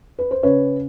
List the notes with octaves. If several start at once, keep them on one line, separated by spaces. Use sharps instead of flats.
B4
C5
C#3 B4 C#5